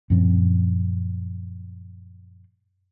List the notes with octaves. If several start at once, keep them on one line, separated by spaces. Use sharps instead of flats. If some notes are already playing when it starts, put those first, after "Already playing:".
F#2 A#2 F3 C4